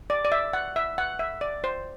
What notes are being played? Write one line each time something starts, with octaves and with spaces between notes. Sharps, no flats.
D5
D5
E5
F#5
E5
F#5
E5
D5
C5